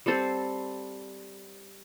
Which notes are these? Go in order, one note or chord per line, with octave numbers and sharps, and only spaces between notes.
G3 C4 A4 C5